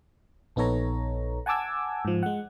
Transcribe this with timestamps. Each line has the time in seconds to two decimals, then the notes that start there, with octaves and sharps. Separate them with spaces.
0.56 A#1 B3 D#4 A4 C#5 A#5
1.46 F#5 G#5 A5 D6 E6 G#6
2.05 G#2 F3
2.23 G#3 F#5